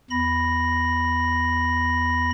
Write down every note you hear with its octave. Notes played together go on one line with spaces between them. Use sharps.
E2 B5 A#6